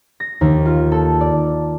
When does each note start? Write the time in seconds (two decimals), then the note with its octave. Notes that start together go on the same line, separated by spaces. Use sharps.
0.20 A#6
0.41 D#2
0.66 F4
0.92 A4
1.21 D5